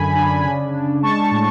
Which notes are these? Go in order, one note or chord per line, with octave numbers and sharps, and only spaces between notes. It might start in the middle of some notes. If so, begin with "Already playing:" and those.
Already playing: F#2 D3 G#5 B5
D4
C#3
D4
G#3 A5 C#6
A2